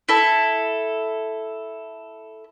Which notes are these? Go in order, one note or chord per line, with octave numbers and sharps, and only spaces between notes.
E4 A4